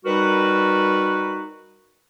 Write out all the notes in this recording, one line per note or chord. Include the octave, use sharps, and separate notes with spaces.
G3 D#4 F#4 A#4 B4